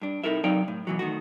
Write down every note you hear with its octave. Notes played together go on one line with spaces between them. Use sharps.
G2 D4
C3 D#4 E4 A4 A#4 E5
C3 F#3 D#4 D5 F5 G5
A2
B2 E3 F#3
D#3 A3 F#4